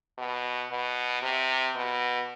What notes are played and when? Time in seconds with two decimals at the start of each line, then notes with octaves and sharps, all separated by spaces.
0.18 B2
0.71 B2
1.23 C3
1.75 B2